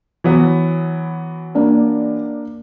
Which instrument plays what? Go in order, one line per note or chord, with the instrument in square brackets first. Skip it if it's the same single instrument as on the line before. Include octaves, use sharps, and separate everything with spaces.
[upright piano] E3 F#3 B3
[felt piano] A#3 D4 D5